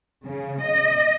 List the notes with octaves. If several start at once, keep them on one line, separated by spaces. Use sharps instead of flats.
C#3
D#5